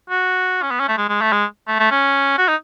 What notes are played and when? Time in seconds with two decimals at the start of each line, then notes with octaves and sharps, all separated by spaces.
0.10 F#4
0.62 C#4
0.71 B3
0.80 C#4
0.89 A3
0.98 G#3
1.09 G#3
1.21 A3
1.32 G#3
1.68 A3
1.79 A3
1.91 C#4
2.38 F#4
2.48 D#4